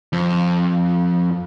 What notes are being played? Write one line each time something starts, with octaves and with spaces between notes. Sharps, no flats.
F2